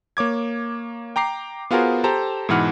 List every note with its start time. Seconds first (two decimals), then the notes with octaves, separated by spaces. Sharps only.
0.17 A#3 C#5 D6 G#6
1.16 G5 A#5 D6 C7
1.71 B3 F4 F#4 G#4 A#4 C5
2.04 G4 A4 C5 A5 A#5
2.49 G#2 B2 E3 B4 F#5 F6